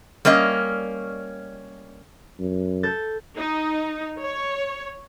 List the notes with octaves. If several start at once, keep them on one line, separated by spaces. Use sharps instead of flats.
G3 A#3 C#4 D#5
F#2
A4 G6 A6
D#4
C#5